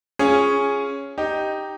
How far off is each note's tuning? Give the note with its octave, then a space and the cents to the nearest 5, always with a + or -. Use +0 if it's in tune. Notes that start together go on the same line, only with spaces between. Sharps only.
C#4 +0 F4 +0 G#4 +0
D#4 +0 G4 +0